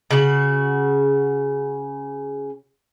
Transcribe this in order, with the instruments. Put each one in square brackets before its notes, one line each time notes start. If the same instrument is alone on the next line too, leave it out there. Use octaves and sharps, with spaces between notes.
[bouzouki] C#3 F#4